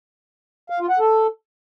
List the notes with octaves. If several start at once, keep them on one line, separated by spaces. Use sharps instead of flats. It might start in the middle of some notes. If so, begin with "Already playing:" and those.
F5
F4
F#5
A4